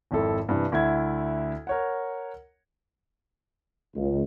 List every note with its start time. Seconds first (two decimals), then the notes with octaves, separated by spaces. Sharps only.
0.11 G#1 F2 E4 A4
0.49 G2 C3 E3
0.72 D2 E4 F#5 G#6
1.67 A#4 C#5 F#5
3.96 C#2